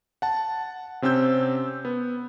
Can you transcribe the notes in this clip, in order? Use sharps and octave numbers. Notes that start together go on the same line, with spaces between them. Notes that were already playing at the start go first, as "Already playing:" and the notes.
F#5 A5
C3 C4 C#4 E6 G6
B3